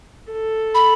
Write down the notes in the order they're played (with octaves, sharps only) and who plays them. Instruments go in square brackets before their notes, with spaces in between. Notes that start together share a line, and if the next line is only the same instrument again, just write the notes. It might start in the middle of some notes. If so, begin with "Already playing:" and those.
[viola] A4
[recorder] B5